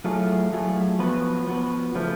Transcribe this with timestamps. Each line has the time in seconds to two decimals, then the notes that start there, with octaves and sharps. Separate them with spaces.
0.04 A2 F#3 A3 F4 G#4
0.52 A2 F#3 A3 F4 G#4
0.99 F3 B3 F#4 B4
1.47 F3 B3 F#4 B4
1.95 C#3 F3 A3